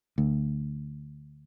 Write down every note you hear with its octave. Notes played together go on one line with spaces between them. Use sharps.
D2